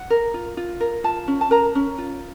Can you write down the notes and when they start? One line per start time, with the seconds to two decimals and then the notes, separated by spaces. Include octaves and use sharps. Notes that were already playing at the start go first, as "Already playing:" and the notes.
Already playing: F#5
0.10 A#4
0.34 F4
0.57 F4
0.80 A#4
1.04 F4 A5
1.28 C#4
1.41 A5
1.51 A#4 A#5
1.75 C#4
1.98 F4